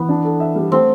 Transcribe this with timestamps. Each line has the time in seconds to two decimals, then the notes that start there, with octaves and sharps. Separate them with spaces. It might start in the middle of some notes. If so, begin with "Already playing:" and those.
Already playing: E3 B3
0.09 D4
0.24 A4
0.40 E5
0.55 G3
0.71 A3 C4